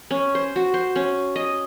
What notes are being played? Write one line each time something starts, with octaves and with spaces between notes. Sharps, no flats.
C#4
C5
F#4
C5
C#4
D#5